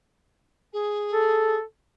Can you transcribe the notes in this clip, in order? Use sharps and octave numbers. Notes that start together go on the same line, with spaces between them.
G#4
A4